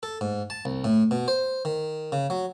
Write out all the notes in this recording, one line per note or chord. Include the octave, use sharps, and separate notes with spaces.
A4
G#2
A5
C2
A2
B2
C5
D#3
C#3
F#3